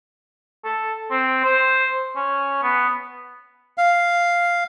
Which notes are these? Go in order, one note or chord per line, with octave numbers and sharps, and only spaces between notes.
A4
C4
C5
C#4
B3
F5